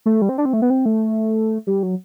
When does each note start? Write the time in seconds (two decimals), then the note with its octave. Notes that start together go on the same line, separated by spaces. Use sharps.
0.06 A3
0.22 G3
0.29 C4
0.38 D4
0.45 C4
0.53 A3
0.62 B3
0.70 C4
0.86 A3
1.67 G3
1.83 F#3